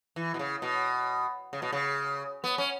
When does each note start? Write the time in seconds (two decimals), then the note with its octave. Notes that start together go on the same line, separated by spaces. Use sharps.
0.16 E3
0.34 B2
0.39 C#3
0.62 B2
1.53 C#3
1.62 B2
1.72 C#3
2.44 B3
2.58 C#4